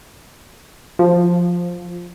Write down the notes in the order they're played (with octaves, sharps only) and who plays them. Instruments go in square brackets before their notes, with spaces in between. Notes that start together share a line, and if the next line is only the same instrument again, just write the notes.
[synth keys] F3